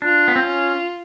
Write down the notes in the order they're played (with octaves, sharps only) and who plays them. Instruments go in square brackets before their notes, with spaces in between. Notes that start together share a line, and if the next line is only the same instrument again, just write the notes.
[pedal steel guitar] D4 [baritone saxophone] F4
[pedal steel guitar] B3
C4
C#4